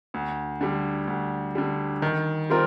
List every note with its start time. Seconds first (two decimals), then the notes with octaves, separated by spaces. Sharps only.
0.14 D2
0.61 D3 G3
1.07 D2
1.55 D3 G3
2.02 D#3
2.50 G3 C4 F4 A#4